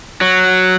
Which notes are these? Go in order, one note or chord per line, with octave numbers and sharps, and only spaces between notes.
F#3